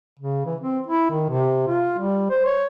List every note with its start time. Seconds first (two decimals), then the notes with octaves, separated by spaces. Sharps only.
0.19 C#3
0.46 E3
0.61 C4
0.87 E4
1.10 D#3
1.30 C3
1.68 F4
1.98 G3
2.30 C5
2.45 C#5